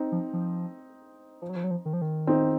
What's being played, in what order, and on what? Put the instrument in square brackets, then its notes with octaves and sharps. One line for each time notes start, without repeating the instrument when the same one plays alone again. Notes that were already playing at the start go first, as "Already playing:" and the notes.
Already playing: [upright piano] C4 D#4
[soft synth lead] F3
F3
F3
F#3
F3
F#3
F3
D#3
F3
D#3
[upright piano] C4 D#4